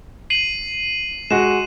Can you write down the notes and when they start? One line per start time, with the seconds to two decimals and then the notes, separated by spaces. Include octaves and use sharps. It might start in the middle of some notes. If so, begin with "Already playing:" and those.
0.30 C7 D#7 F#7
1.31 G#3 F#4 E7